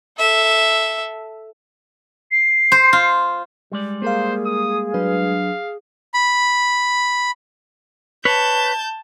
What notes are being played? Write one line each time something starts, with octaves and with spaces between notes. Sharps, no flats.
A4 E5
C7
C5
F4
G3 G#3 D5
A#3 G#4 A#4 C5 F5
D#6
F#3 D4 B4 F5
B5
B4 C#5 A5 G6